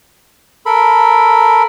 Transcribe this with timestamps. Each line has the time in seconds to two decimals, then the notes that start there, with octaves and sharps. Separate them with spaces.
0.66 A4 A#4 B5